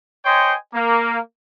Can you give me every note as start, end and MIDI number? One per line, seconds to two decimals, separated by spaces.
0.25 0.55 72
0.25 0.55 73
0.25 0.55 75
0.25 0.55 79
0.25 0.55 80
0.25 0.55 84
0.74 1.19 58